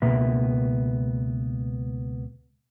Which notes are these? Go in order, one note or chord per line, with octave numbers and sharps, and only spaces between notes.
C#2 B2 A#3 B3 B4 E5